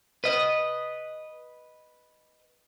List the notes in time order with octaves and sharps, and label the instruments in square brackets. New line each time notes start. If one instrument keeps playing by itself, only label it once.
[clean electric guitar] B4 D#5